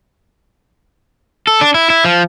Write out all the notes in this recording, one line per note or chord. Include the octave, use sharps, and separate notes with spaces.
A4
D4
E4
E4
F3